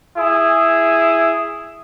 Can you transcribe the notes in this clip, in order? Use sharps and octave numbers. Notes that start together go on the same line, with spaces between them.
E4 G#4